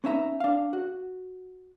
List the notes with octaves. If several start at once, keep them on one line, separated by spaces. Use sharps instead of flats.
B3 C#4 D#4 E5 A#5
D4 F5
F#4